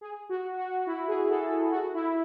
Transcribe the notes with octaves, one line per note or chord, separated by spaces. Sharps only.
G#4
F#4
F#4
E4
G#4
A4
F#4
E4